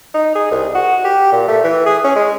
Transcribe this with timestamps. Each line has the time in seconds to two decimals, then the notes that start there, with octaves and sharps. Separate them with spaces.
0.14 D#4
0.35 G#4
0.51 C2
0.75 F#4
1.04 G4
1.32 A#2
1.48 A3
1.64 E3
1.86 G#4
2.04 C#4
2.16 G#3